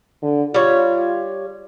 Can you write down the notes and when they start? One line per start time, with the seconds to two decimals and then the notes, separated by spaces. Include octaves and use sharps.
0.22 D3
0.54 G3 F4 C#5